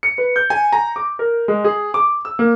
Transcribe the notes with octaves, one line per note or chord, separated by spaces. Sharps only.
C#7
B4
G6
G#5
A#5
D6
A#4
G#3
G#4
D6
E6
A#3